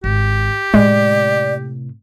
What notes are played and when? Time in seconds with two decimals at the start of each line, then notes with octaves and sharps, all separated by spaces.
0.04 G#1 G4
0.74 A2 C3 G#3 D5